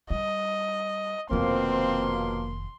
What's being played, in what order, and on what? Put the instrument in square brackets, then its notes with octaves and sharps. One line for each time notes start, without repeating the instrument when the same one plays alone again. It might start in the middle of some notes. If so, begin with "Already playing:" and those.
[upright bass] G3 [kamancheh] D#5
[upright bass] F1 D#3 [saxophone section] B2 F3 A#3 [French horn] C4 [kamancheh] C6